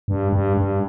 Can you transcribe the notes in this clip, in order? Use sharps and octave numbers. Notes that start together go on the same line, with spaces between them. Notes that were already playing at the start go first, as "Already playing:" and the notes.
G2
G2
G2